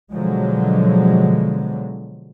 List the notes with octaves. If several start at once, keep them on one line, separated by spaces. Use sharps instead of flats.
B2 D3 F3 F#3 G#3